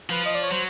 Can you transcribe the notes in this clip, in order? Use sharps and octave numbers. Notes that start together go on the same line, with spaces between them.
F3 B4
D#5
D5
C#5
F#3 C5